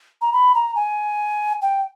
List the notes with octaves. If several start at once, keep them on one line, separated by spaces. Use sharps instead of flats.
A#5
B5
A#5
G#5
G5